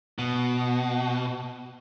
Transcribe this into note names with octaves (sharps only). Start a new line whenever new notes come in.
B2